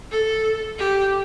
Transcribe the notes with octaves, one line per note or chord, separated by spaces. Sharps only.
A4
G4